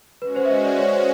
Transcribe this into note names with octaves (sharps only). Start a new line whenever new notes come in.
G#3 C#4 F#4 B4
C5
E5
D#5
D5
C#5
C5